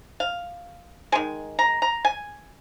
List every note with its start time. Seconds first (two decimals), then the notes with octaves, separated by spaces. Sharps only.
0.20 F5
1.12 D#3 G#3 G#5
1.59 A#5
1.82 A#5
2.05 G#5